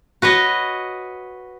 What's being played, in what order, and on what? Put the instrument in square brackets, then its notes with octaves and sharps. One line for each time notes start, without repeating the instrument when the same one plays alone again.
[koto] F#4 B4 C#5 D#5